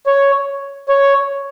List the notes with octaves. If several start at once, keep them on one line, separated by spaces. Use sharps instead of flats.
C#5
C#5